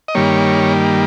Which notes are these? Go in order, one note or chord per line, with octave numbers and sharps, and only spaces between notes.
D#5
G2 D#3 G3 A#3 C#5